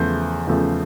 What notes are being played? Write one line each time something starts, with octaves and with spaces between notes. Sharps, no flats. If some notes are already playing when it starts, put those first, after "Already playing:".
Already playing: E2 C#3 F3 A3 C5
E2 C#3 F3 A3